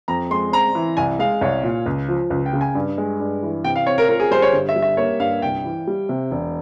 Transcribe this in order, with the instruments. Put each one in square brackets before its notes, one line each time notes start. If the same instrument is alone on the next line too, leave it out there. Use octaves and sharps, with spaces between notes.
[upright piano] F2 [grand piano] A#5
[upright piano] G#3 [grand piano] C6
[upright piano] C4 [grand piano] A#5
[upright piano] E3
[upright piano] C2 [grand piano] G#5
[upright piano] G#3 [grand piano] F5
[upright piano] C2 [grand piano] C#5
[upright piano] A#2
C#2
F3
C#2
[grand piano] G5
[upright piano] C#3
[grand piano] G#5
[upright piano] G2
G#3
G2
E3
[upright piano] C3 [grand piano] G5
[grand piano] F5
[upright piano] C4 [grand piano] C#5
[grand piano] A#4
[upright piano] F4 [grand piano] A#4
[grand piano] G#4
[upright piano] G3 [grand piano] C5
[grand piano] C#5
[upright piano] G1
[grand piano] E5
[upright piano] G3
[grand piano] E5
[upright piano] A#3 [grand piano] C#5
[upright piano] G2 [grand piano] F5
[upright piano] C2 [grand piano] G5
[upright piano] E3
G3
C3
E1